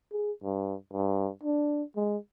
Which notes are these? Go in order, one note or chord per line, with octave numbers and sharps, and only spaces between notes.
G#4
G2
G2
D4
G#3